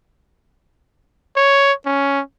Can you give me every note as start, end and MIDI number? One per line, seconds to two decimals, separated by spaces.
1.36 1.73 73
1.86 2.21 61